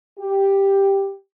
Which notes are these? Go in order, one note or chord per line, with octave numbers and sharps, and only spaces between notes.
G4